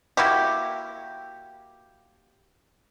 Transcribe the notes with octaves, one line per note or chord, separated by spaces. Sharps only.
A#3 E4 F#4 G4